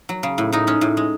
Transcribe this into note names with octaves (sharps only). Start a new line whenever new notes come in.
F#3
C#3
A2
A2 D#4
G#3 C#4
A2
G#3